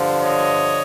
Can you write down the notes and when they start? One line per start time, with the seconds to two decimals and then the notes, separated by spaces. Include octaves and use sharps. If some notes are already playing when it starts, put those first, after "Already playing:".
Already playing: G2 D3 F3
0.20 C#5 D#5